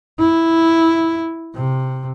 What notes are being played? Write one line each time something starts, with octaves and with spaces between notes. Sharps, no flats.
E4
C3